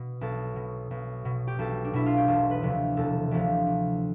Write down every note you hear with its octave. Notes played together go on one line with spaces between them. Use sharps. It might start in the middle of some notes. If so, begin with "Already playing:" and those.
Already playing: B2
B1 A4
B2
B1
B2
G4
B1 A4
D4
B2 E4
F4
G4
E1 A4
B4
D2 C3 F3
E1 A4
D2 C3 F3
D2